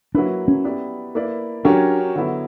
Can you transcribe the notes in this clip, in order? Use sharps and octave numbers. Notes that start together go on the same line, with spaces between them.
F#3 A#3 D4 E4 B4
C#4
B3 E4 G4 B4 D5
A#3 E4 B4 D5
F#3 C#4 D4 G4 A#4 C#5
D3 F#3 B3 E4